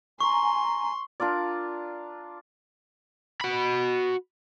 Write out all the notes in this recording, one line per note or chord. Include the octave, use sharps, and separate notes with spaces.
G#5 A#5 C6 C#6
D4 F4 A#4 D5
F#4 B5